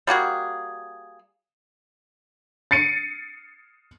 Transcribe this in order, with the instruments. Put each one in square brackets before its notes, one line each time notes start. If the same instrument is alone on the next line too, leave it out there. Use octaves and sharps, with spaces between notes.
[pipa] G3 A#3 F#4 G#4
[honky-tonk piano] A6 C7 C#7 D#7